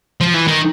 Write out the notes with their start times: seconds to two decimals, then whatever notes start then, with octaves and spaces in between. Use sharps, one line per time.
0.21 F3
0.34 E3
0.47 D#3